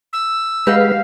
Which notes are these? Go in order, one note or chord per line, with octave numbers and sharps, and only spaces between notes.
E6
G#3 G4 B4 D#5 F5 F#5